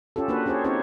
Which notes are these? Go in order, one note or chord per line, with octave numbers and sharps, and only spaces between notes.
C#4 F4 G4 A4
A#3 D4 F#4 B4
C#4 F4 G4 G#4 C5 C#5
C4 C#4 D#4 G4 C5 C#5